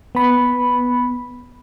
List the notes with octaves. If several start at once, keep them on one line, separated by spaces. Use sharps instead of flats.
B3 B5